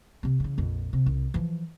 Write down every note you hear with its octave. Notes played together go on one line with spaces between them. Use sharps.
C3 C4
C#3 E3
A#1 F2
C3
C2
E3 F3